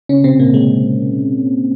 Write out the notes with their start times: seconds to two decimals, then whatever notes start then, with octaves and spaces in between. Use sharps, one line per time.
0.09 C#3 C#4
0.24 C3 C4
0.39 A#2 A#3
0.54 G#3